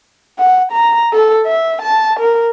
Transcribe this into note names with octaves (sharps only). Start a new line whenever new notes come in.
F#5
A#5
A4
E5
A5
A#4